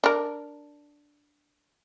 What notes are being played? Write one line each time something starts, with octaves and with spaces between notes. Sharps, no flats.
D4 A#4